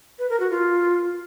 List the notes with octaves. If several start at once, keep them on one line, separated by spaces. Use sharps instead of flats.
B4
A#4
F#4
F4